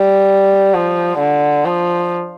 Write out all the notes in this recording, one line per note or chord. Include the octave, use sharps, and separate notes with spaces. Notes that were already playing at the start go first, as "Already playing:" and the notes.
Already playing: G3
F3
D3
F3